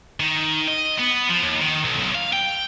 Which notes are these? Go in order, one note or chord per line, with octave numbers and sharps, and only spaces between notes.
D#3
D#5
B3
F3
D#2
D#3
B1
B1
F5
G5